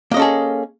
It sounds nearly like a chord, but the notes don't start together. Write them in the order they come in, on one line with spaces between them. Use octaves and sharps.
A#3 D#5 C#4 A4 G#4